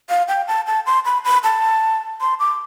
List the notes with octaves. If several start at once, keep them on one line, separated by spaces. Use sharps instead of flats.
F5
G5
A5
A5
C6
B5
B5
A5
C6
D6